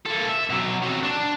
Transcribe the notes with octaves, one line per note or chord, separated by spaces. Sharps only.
A#3 A4
E5
B2 F#3
F#3 C4
D4